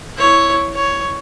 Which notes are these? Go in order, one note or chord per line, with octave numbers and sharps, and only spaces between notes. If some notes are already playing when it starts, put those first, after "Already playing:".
E4 C#5
C#5